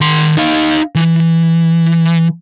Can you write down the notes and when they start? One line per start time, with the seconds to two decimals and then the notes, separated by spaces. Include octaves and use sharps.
0.01 D#3 C6
0.37 D#4 F5
0.95 E3